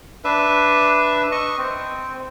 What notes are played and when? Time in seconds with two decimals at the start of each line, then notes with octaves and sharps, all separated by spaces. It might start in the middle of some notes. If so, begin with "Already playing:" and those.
0.24 D4 B4 E5
1.32 D#5 C#6
1.58 C4